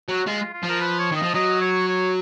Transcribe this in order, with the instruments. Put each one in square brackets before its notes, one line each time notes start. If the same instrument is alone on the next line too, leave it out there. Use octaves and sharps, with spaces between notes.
[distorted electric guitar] F#3 [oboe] F#4
[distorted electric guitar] G#3 [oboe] F4
[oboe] F4
[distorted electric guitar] F3
[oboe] A#4
B4
C#5
[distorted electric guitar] D#3 [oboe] D#5
[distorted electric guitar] F3
[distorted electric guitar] F#3 [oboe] D#5
[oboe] C#5
C#5